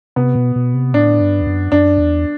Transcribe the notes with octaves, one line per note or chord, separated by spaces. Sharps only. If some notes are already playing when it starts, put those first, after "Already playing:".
C3 B3
B2
B2
C3
A2 D4
G2
E2
F#2
F#2 D4
E2